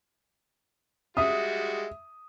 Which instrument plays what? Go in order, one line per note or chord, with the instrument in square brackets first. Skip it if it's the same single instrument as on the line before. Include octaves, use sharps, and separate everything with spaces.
[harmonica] G3 G#3 F#4 [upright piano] E5 D#6